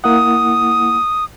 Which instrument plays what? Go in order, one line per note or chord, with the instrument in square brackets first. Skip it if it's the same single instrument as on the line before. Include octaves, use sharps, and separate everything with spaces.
[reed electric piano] A#3 E4 F#5 [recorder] D#6